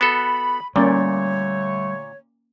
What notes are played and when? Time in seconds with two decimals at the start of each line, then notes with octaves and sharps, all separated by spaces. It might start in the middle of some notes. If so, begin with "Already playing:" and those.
0.01 B3 F#4 A4 B5
0.76 A#2 D3 G3 A3 A#3 C#4 C#5 D5